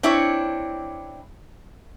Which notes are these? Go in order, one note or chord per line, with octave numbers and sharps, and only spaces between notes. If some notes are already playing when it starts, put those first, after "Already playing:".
C4 D4 E4 C#5